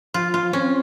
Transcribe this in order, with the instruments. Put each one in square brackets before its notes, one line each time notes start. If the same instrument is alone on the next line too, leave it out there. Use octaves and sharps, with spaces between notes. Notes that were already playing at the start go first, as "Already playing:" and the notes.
[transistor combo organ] F3 [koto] F4
[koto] F4
[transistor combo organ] C4 [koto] C#4